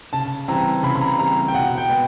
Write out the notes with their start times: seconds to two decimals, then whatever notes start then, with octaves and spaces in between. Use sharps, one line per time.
0.13 C#3 A5
0.48 E3 G3 C4 A#5
0.83 C#3 B5
0.95 B5
1.02 A#5
1.18 E3 G3 C4 A#5
1.48 G5
1.54 B2 F#5
1.78 G5
1.89 G#3 B3